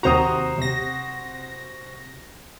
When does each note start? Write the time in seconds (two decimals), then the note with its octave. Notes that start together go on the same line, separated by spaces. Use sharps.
0.03 D#2 C3 F#4 C5 A#5 D#6
0.58 C3 A#6